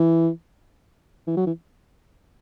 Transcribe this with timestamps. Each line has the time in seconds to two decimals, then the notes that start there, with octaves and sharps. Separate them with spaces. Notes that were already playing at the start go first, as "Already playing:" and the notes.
Already playing: E3
1.27 E3
1.37 F#3
1.47 E3